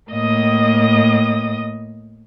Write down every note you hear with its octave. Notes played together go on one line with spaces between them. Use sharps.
A2 A#3 D#5 D#6